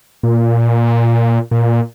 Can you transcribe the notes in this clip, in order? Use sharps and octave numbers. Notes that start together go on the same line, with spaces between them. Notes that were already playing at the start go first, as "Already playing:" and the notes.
A#2
A#2